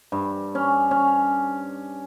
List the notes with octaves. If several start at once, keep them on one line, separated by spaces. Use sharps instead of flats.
G2
C#4
C#4